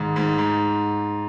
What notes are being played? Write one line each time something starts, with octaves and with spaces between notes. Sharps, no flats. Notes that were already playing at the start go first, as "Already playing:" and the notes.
Already playing: G#2 D#3
G#2
G#2